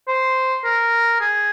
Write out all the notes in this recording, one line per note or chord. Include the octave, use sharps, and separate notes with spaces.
C5
A#4
G#4